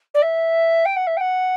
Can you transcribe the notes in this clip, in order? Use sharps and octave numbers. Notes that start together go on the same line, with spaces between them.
D5
E5
G5
F#5
E5
G5
F#5